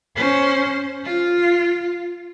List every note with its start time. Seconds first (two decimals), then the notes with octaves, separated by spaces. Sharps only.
0.16 C#4 C5
1.04 F4